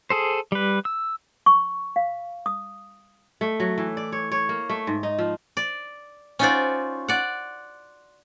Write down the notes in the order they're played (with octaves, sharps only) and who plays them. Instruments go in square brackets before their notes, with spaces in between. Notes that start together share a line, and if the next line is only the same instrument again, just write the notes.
[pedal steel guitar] G#4 A4 C5
G3 B4
E6
[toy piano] C#6
F5
D#6
[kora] A3
F#3
E3
D5
C#5
C#5
A#3
A3
G#2
D#4
F3
[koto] D5
C#4 D#4 F4 F#4 C5 D5
D5 F#5